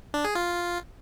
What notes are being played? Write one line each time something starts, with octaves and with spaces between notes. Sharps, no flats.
D4
G#4
F4